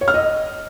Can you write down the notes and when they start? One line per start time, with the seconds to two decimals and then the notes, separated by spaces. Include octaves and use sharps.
0.01 C#5
0.08 F6
0.14 D#5